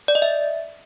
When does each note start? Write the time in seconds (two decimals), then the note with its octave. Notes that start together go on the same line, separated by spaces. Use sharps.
0.08 D5
0.15 D#5
0.22 E5